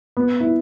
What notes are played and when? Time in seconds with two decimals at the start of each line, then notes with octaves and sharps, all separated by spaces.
0.17 B3
0.40 E4